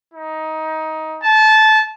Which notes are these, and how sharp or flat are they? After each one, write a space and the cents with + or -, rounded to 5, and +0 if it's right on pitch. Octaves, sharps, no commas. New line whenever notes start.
D#4 +15
A5 -20